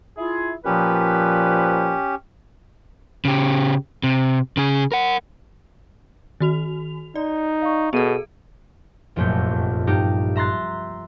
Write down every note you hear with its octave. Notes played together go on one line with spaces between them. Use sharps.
E4 F4 G#4
A#2 F3 C#4 G4 B4
C#3 G4
C3
C#3 G#4
A#4 F#5
D#3 F#4 F7
D#4 D5
F5 C#6
B2 B3 G#4 A4 D#7
F1 A#1 F#2 A#2 A3 G6
G2 D#4 G4
E5 A#5 C6 F#6 A6